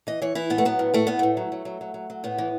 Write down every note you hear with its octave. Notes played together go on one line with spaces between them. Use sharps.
E3 D#5
E3 C#5
E3 E4
A2 B3
A3
F#3 B3
A2
A2 A3
A2 B3
A2 A3
F#3
F#3
F#3
F#3
F#3
F#3
A2 B3
E3